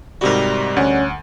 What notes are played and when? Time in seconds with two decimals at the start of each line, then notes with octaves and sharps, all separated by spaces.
0.21 G#2 C3 G3 F#4 A#4
0.76 D2 C#4 F#5